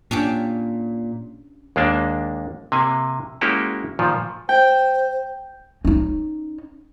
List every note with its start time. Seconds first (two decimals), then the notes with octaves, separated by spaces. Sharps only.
0.11 A#2 C#4 D4 G4
1.76 D#2 G#3 A#3 D4 A5
2.72 C3 A#3 G#5
3.41 G#3 A#3 C#4 E4 F#4 G4
3.99 A#2 D#3 F3
4.49 C5 G5
5.85 C#4 D#4